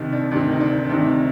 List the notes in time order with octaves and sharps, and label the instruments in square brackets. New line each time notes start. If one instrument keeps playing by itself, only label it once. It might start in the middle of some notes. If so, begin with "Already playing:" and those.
Already playing: [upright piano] C2 C3 D#3
D4
D2 C3 D#3 D4
D#4
D4
D4
D2 C3 D#3 D#4